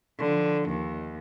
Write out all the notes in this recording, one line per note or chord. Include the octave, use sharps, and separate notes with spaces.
D3 F3
D#2